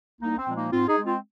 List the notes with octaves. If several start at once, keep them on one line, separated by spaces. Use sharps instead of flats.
C2 A#3 D#4
C4
A#2 F3 G#3
A#3 D#4
G#2 C4 F4
D#4 G#4
G#3
C4 F4